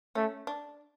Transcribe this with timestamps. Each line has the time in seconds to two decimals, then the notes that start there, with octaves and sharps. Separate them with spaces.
0.15 A3 C#4
0.47 D4